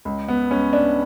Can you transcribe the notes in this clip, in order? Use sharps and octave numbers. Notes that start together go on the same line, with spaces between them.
C#2
B3
C#2 C#4
D4